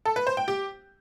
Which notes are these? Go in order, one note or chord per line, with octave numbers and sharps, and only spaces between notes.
A4
B4
C5
G5
G4